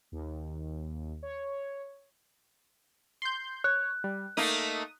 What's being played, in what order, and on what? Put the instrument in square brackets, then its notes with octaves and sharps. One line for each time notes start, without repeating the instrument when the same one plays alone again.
[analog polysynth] D#2
C#5
[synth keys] C6 G6
[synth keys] C#5 [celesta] F#6
[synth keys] G3
[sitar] A3 A#3 D#4 [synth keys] D#6